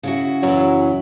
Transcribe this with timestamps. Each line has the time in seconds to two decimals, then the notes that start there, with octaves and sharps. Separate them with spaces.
0.03 C#3 E4 F#4
0.43 F#2 E3 F#3